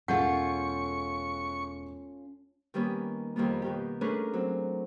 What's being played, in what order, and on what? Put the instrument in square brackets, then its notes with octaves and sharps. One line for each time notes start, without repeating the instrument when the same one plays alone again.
[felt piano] E1 G#4 G6 [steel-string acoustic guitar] C#4 F4 A4 [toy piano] F#5 [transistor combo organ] C#6
[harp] D#3 G3 A#3 B3 C#4
F2 D#3 G3 A#3 B3
B2 D#3 G4
A3 C#4 D4 G#4 A#4 B4
F#3 C4